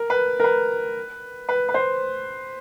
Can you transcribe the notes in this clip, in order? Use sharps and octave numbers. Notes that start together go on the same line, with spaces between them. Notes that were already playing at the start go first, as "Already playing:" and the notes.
Already playing: A#4
B4
A#4
B4
B4
B4
C5